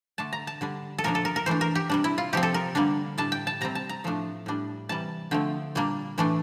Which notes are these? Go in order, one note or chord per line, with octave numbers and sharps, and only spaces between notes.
D3 A3 D4 A5
A#5
A5
D3 G3 D4
A4
A#2 F3 A#3 D4 A#4
A4
A#4
A#4
E3 A3 D4 C5
A#4
G4
C3 G3 D4
E4
F4
C3 F3 C4 G4
A4
A#4
D3 G3 A#3 D4
A2 G3 D4 A5
G5
A5
C3 G3 C4 A#5
A5
A#5
A2 F3 A3 D4
A2 G3 D4
C3 E3 G3 A5
D3 F3 A3 C4 G5
A#2 G3 A#3 D4
A2 E3 A3 D4